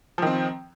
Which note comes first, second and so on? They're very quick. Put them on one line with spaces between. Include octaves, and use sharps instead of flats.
F3 D#3 C4